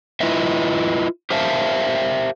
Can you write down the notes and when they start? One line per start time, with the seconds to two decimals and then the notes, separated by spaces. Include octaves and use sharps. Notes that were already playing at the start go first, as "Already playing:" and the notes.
0.20 E4 F4 B4 D#5 E5
1.30 G4 A#4 C5 E5 F5 A5